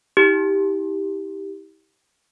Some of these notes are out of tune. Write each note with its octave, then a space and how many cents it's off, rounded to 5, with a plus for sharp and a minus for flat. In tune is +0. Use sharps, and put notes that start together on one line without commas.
E4 -45 G4 +0